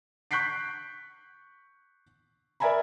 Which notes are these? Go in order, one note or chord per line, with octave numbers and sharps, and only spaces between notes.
C#6 F#6 G6 B6 C7 D7
A#4 D5 E5 G#5 A#5 B5